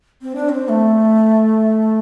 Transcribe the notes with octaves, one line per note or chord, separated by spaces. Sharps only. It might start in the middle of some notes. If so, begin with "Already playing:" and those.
C4
D4
C4
A3